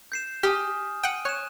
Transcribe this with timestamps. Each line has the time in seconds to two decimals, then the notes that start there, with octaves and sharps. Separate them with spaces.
0.12 G6 C7 E7
0.43 G4 G#5 D#6 F6
1.03 F#5 G5 D#7
1.25 C#5 F#6 E7